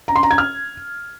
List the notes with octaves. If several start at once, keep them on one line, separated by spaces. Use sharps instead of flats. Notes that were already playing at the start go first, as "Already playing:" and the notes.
A#5
C6
A#5
G#6
F6